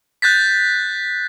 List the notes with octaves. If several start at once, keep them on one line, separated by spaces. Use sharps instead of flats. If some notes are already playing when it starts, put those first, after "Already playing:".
F#6 G6 A6 B6